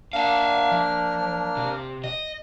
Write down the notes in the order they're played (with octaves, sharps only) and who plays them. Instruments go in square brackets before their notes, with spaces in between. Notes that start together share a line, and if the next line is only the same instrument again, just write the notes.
[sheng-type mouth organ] A#3 D4 F6 [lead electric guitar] E5 F5
[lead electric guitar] F3
C3
D#5